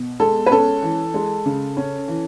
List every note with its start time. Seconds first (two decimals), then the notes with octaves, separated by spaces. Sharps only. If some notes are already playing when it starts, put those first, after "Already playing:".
Already playing: B2
0.20 G#3 A4
0.46 B4
0.51 C#4 A4
0.82 E3
1.14 G#3
1.46 C#3
1.77 C#4
2.08 E3